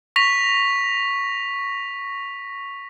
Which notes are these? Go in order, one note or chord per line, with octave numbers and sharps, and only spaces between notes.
C#6 A#6 B6 F7